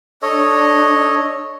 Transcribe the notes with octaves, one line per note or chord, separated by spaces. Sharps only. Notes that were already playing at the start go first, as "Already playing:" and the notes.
D4 A4 C#5 D#5